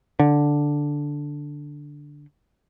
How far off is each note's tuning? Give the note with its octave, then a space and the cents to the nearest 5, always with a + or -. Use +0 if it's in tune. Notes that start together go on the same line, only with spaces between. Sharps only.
D3 -5